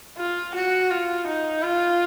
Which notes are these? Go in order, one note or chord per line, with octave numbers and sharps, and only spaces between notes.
F4
F#4
F4
D#4
F4